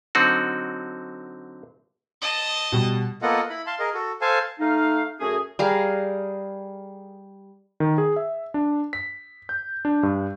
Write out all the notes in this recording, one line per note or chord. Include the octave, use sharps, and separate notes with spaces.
D3 F#3 C4 D#4 F#4
D#5 A5
B2 G3
A#3 B3 F4 A4 D#5 F#5
E4 B5
F5 A5 C6
G#4 A#4 D#5
F#4 A4
A4 C5 F5 G#5 A5
A3 D#4 F5
F#2 A3 C#4 F#4 G#4
G3 G#4 A#4 F5
D#3
G#4
E5
D4
B6
G6
D4
G2